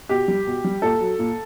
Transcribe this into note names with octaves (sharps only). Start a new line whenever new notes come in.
B2 G4
G3
B2
G3
A#2 A4
F#3
A#2